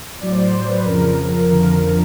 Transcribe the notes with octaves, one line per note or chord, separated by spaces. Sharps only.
A2 F#3 D5
C5
C5
C5
B4
F2 C#3 F3 A#4
F2 D3 F3 A#4